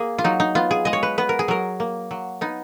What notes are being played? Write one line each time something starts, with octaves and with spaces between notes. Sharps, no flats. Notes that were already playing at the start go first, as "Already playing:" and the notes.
Already playing: A#3 G#4
F4
F#3 D#4
D#4
B3 F4
G#4
G#3 D#5
C#5
B4
B3 B4
A#4
G#4
F#3 A#4
A#3
F#3
B3 D#4